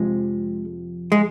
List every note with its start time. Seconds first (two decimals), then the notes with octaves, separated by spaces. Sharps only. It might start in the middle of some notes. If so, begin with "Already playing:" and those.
Already playing: F2 C3 F3 G#3
1.12 G#3